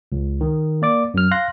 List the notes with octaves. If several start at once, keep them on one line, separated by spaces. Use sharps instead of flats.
C#2
D#3
A#3 D5 D6
F#2 F#3 F6
F5 C6 F#6 A#6